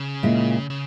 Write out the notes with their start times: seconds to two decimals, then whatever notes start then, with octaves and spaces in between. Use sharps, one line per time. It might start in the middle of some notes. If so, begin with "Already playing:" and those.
Already playing: C#3
0.23 A#2 G#3 E4
0.70 C#3